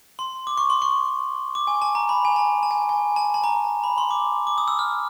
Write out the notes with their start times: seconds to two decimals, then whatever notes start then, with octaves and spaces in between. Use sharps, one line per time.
0.19 C6
0.47 D6
0.57 C#6
0.70 C6
0.82 C#6
1.55 D6
1.67 G#5
1.82 A5
1.95 A#5
2.09 B5
2.25 G#5
2.36 A5
2.63 A5
2.71 G#5
2.89 G#5
3.16 A5
3.34 A5
3.44 A#5
3.84 B5
3.98 C6
4.11 D6
4.47 D6
4.58 D#6
4.68 E6
4.79 F6